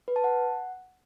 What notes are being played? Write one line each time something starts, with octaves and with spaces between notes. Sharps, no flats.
B4
A5
F#5